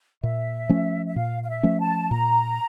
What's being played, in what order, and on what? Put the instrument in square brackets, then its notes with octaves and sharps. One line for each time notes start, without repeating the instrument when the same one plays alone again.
[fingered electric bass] A#2 [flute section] E5
[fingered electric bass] F3 A3 C#4
[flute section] E5
[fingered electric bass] A#2 [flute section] F5
[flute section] F5
E5
[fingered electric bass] F3 A3 C#4
[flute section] A5
[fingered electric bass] A#2 [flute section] A#5